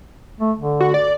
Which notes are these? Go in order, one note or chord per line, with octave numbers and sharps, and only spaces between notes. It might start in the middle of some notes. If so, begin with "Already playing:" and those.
A3
D3
F#4
D5